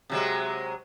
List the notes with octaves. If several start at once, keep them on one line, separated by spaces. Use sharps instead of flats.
C3 F#3 G#3